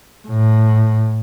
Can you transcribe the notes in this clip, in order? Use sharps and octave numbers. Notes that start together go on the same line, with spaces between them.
A2